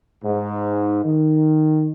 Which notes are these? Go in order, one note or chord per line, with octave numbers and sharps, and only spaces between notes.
G#2
D#3